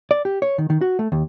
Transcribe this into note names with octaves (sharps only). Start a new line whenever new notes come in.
D5
G4
C#5
D#3
D#3
F#4
A3
D#2